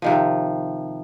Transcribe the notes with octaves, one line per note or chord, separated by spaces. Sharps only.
C3 D#3 F3